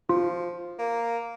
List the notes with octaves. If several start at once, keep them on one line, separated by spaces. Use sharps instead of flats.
F3 F4
A#3